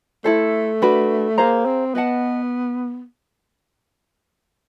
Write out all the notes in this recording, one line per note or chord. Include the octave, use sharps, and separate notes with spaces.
A3 E4 A4 C5
D4 F#4 B4
A#3 G#4 C5 F5 A#5
C4
B3 B4 D#5 F#5 A5